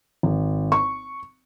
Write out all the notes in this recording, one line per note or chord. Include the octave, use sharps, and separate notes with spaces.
G#1
C#6